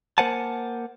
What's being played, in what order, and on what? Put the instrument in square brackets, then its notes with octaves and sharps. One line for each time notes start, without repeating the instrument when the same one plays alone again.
[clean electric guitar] A#3 A#4 C5 F#5 G#5 A5